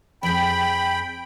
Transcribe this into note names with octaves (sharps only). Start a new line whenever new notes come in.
F2 G#4 G5 B5